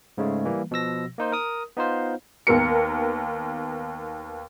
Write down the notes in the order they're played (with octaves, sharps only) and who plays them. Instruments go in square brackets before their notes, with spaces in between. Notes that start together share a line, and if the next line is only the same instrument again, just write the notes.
[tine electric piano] G#2 C#3 G#3 A3
E3 G3 A#3
B2 F3 E6 A#6
A#3 D#4 C5
A#4 D#6
B3 D#4 F4 C5 F5
[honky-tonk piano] D#2 B3 A#4 C#7